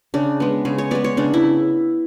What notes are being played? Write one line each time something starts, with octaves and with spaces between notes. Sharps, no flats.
C#3 D4
G#3 B3
C#3 G#4
C#5
G#3 B3 D5
C#5
C#3 D4
E4